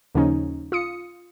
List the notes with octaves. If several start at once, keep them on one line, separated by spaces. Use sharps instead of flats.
D#2 C#3 F3 C#4 D#4
F4 D#6 C#7